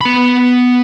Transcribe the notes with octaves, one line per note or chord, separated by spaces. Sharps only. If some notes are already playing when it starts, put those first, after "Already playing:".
B3 B5